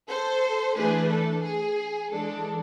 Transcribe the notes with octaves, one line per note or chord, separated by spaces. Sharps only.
A4 C5
E3 A3 D4 G#4 B4
A4
G#4
E3 G#3 D4 A4